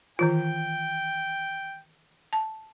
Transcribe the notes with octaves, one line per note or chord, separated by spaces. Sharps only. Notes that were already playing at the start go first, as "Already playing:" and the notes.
D#3 E3 F4 G5
A5